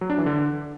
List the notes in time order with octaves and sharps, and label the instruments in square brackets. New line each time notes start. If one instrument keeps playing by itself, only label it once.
[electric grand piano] F#3
D4
E3
D3